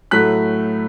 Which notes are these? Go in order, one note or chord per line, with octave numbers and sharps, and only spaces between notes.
A2 F#3 A3 F#6 B6